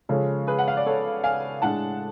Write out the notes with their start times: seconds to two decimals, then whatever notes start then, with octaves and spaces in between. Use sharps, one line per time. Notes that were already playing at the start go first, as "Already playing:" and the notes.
0.09 C#3 F3 G#3 C#4 A4
0.47 G#4 B4
0.58 F#5
0.68 F5
0.77 D5
0.86 A4 C#5
1.24 F5 G#5
1.62 A2 G#3 D4 F#5 A5